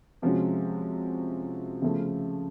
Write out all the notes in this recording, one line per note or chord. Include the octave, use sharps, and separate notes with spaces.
C3 F3 G#3 C#4 F#4
C#3 F3 A3